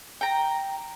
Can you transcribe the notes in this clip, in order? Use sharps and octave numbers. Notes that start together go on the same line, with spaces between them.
G5 A#5